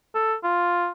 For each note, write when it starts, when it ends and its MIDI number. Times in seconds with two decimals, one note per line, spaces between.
0.15 0.35 69
0.44 0.89 65